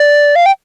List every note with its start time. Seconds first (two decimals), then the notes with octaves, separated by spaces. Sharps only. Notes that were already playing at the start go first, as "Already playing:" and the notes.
Already playing: D5
0.36 F5
0.46 G5